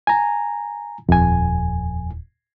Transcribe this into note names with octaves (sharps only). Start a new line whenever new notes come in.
G#5 A#5
D#1 F2 G#5